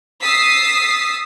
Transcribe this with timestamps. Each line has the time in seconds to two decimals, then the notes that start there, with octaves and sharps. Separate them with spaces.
0.23 D#6 E6 A6 B6 C7